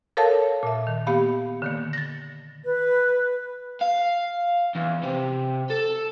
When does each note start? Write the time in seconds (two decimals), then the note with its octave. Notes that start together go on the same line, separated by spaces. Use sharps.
0.17 A4 A#4 C#5 F5 A5
0.63 A#2 E5
0.87 D#3
1.07 A#3 B3 G4 F5 B5
1.62 D3 D#3 A#3
1.93 A6 A#6
2.64 B4
3.81 F5
4.75 E2
5.03 C3
5.70 A4